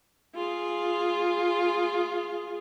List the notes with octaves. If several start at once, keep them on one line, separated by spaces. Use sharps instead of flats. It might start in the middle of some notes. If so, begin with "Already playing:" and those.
F4 G#4